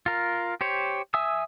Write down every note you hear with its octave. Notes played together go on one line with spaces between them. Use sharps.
F4 A#4
G4 C5 C#5
E5 G#5 D#6 E6